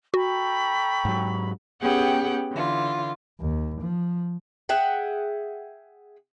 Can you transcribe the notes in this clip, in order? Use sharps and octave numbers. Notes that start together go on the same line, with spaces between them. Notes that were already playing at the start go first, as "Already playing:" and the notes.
F#4 A4 G5 A#5 B5 C#6
G#2 F#3
B3 C#4 G4 G#4 F#5 G5
D3 E3 F4
D#2
F3
G#4 E5 F#5 G5